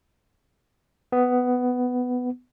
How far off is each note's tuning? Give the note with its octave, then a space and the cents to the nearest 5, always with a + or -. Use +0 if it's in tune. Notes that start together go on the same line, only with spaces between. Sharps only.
B3 +10